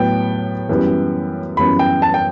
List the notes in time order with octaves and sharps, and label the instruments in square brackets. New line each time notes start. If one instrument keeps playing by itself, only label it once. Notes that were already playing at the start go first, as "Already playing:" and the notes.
Already playing: [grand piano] A2 F#3 B3 [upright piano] G5
[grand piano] F#2 E3 G3 B3
[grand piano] F#2 E3 G3 B3 [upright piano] B5
[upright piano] G5
A5
G5